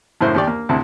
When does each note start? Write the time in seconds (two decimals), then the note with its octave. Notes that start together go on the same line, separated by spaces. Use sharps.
0.21 F#2 A2 C#3 E4 C5
0.34 D#2 G4 D5
0.47 A#3
0.69 D2 C3 E4 A5